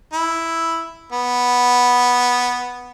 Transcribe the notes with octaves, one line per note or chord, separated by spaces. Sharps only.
E4
B3